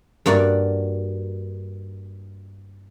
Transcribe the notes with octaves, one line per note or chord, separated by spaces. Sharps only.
G2 A#3 F#4 D5